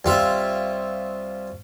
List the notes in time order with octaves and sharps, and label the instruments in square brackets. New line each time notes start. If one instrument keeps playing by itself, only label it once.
[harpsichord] C2 F4 E5